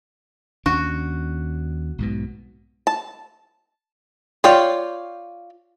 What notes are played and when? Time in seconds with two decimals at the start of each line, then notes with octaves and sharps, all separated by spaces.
0.66 D#2 C#4 D4 F#4
1.98 B1 G#2 B2
2.87 A5
4.44 F4 C#5 D5 F5 G5